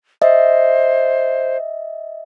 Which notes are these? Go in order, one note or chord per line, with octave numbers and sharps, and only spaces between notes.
C5 D#5 E5